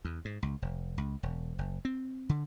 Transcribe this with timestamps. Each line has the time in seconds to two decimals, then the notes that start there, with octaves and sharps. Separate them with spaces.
0.05 E2
0.25 G#2
0.43 C#2
0.62 F1
0.98 C#2
1.23 E1
1.58 F#1
1.85 C4
2.29 D3